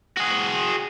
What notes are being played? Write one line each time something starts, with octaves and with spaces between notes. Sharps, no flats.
F#4 G#4